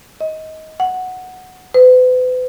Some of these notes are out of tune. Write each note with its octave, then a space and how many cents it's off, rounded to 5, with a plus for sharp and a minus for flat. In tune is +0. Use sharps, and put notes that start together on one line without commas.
D#5 +20
F#5 -5
B4 +40